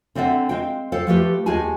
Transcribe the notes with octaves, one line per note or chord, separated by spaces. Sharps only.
D3 C4 D5 E5 F#5
G#3 C4 F5 G5
A4 C5 F5 G5
F3 A3 G4 B4
D#2 G#3 G4 G#4 G#5 A5